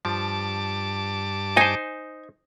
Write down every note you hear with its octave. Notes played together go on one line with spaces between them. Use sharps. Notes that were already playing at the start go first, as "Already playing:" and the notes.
G2 F3 A5 D6
D#4 C5 G#5